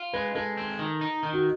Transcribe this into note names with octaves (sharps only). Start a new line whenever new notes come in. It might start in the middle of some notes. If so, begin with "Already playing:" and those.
Already playing: F4
G#3 B4
G#3 A4
C4
D#3
D#4
D#3
F#4